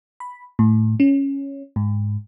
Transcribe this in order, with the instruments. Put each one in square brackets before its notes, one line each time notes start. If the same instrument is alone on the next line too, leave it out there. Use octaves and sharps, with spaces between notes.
[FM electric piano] B5
A2
C#4
G#2